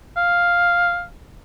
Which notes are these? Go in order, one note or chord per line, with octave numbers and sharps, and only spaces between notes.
F5